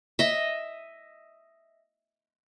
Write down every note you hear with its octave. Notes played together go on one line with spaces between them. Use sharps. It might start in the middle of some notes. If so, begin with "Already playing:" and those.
D#5 E5